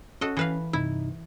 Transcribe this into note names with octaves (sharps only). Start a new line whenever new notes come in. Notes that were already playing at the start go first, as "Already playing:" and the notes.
C#4 F#4 A4 D#5
E3 B4 F5
G2 C3 D#4 E4